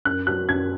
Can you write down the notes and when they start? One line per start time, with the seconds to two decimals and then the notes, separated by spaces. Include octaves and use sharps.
0.05 F#2 F#6
0.27 F#3 F#6
0.49 F#2 G#6